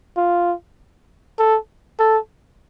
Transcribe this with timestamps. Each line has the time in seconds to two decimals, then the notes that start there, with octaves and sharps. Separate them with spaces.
0.17 F4
1.39 A4
2.00 A4